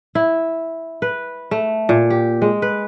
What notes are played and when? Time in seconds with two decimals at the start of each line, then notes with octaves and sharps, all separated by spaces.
0.15 E4
1.02 B4
1.51 A3
1.89 A#2
2.10 G4
2.42 G#3
2.62 B4